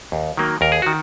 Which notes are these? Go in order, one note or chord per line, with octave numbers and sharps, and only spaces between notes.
D#2
D#3 F#3 A#3
D#2 A#4
G#4
D#3 F#4